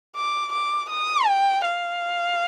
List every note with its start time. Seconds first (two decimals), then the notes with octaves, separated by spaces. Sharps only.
0.16 D6
0.53 D6
0.90 D#6
1.26 G5
1.64 F5